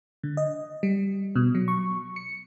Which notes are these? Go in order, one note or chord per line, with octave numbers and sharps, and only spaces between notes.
D3
D#5
G3
B2
F#3
C#6
C#7